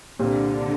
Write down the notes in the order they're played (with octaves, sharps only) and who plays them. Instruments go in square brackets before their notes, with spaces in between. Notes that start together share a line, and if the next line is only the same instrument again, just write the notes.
[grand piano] C2 A#2 G3 C4 [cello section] D3